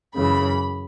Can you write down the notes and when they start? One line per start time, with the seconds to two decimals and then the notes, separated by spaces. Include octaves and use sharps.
0.14 F#2 C#3 E3 B5